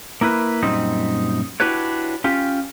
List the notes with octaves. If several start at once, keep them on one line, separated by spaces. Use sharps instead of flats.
A#3 E4 A#4 B4
F#2 A#2 G3 C4 D#4
D4 E4 F#4 G4 B4 C#5
C#4 F4 G4